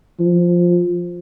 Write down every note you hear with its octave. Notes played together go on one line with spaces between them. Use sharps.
F3